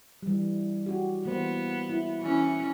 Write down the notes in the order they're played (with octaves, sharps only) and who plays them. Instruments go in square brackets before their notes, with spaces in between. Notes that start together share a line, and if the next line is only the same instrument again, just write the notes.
[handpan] E3 G3
F#4 G4
[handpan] E3 A#3 C5 [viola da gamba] B3
[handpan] E4
[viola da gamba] E3 C#4